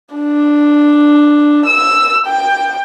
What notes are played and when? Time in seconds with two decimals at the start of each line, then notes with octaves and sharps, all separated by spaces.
0.15 D4
1.66 E6
2.27 G5